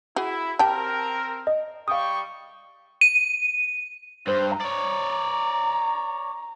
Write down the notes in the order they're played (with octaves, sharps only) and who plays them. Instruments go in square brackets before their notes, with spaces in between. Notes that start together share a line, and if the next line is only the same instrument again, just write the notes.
[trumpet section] E4 [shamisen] F#4 G#4
[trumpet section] C4 A#4 [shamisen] G4 G5 [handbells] A5
[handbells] D#5
[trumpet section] G3 G5 C#6 [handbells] F5 D#6
[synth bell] D#7
[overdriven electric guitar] G2 [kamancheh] C5
[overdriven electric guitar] C#5 D5 [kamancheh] A#5